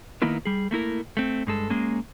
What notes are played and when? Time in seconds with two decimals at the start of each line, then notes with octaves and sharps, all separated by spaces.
0.22 D#3 A#3 B3 D#4 E4 A#4
0.45 G3 G#4
0.71 A3 A#3 E4 A#4
1.17 A3 C4
1.47 G2 G#3 A4
1.70 G#3 A#3 C#4